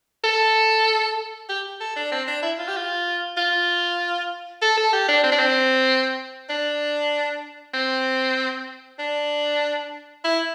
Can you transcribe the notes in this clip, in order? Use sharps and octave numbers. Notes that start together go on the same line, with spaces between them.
A4
G4
A4
D4
C4
D4
E4
F4
G4
F4
F4
A4
A4
G4
D4
C4
D4
C4
D4
C4
D4
E4